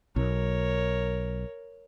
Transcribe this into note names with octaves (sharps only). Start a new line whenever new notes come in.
B1 A#4 C#5